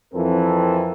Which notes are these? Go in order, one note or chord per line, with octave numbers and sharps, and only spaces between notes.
F2 E3 F3 C4 A4 A#4